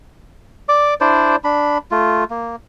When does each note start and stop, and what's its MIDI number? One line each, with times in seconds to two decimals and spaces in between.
0.69 0.94 74
0.69 0.94 86
1.01 1.36 62
1.01 1.36 64
1.01 1.36 72
1.01 1.36 74
1.44 1.78 62
1.44 1.78 83
1.91 2.24 57
1.91 2.24 65
2.30 2.56 58